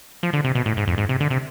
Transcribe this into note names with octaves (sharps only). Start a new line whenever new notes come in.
F3
D3
C3
B2
A2
G#2
F2
G#2
C3
D3
C3